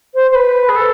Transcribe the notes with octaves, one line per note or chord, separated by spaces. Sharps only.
C5
C5
B4
G#4
A4